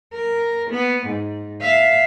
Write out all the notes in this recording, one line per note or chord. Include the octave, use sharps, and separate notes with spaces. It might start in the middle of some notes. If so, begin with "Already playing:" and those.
A#4
B3
G#2
E5 F5